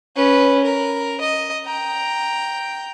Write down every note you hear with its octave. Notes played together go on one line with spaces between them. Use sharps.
C#4 B4
A#4
D#5
G5 A#5